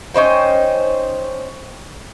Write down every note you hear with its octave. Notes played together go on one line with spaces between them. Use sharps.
C#4 D#4 C5 G5